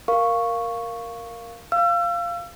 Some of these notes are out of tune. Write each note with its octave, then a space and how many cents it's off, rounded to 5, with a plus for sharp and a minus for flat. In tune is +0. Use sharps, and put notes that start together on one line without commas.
A#4 +0 F5 +0 C#6 +0
F5 -10 E6 +35